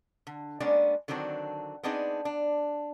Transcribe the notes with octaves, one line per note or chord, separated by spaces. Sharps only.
D3
G#3 A#3 B3 C#4 D4 D5
D3 D#3 F#3 C4 D4
B3 C4 D4 D#4 G#4
D4